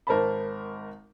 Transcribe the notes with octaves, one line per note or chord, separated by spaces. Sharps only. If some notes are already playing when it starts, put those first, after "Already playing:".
G#1 A#4 C5 A5 B5